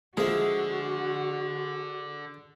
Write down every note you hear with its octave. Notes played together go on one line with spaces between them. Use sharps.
D3 F3 G#3 F#4 G#4 E5